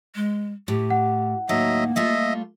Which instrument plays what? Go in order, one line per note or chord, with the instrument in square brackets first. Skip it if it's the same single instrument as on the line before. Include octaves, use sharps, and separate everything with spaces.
[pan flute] G#3
[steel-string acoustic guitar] A2 [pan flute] G4
[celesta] F#5
[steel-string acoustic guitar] D#2 A2 D#4 [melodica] F#3 D#5 E5 [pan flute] A#3
[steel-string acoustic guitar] G3 A3 F4 [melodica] D#5 E5